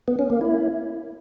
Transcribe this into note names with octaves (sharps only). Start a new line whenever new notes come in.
B3
C#4
A#3
E4